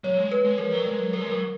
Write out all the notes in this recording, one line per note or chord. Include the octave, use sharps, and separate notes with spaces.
F#3 C#5
G#3
B4
G#3
F3 A#4
F#3
G#3
F#3
F#3 A#4
G#3
F#3 A#4